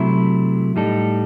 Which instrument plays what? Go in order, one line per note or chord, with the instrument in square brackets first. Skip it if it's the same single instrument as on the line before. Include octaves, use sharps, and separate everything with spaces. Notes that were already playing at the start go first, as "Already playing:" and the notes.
Already playing: [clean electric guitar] C3 F#3 A3 E4
A2 G3 D#4 A4